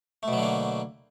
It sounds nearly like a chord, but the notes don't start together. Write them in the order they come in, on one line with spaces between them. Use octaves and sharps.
A3 B2 F#3 D3 A#3